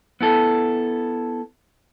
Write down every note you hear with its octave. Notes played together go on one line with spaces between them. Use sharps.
B3 E4 A4